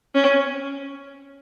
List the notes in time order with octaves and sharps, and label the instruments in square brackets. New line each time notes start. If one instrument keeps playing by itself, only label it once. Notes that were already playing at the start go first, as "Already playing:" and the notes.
[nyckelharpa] C#4